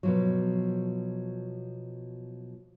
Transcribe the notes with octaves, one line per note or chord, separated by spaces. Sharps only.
B2 F3 F#3